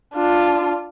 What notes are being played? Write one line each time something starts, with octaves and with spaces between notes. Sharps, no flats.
D4 F4